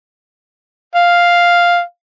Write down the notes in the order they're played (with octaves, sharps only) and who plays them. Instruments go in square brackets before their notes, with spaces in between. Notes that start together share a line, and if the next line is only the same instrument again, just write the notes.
[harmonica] F5